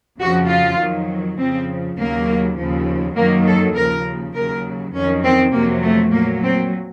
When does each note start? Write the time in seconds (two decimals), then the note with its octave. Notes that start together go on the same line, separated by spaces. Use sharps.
0.20 F2 C#3 F3 F#4
0.49 F4
0.79 F2 D#3 F#3
1.38 F2 C#3 F3 C4
1.98 D#2 C#3 F#3 A#3
2.56 D#2 C#3 F3
3.16 F#2 D#3 F#3 A#3
3.47 A4
3.75 D#2 C#3 F3 A#4
4.35 D#2 C#3 F#3 A#4
4.94 F2 D#3 F#3 C#4
5.24 C4
5.53 F2 C3 F#3 A#3
5.83 A3
6.12 A#2 F#3 A#3
6.43 C4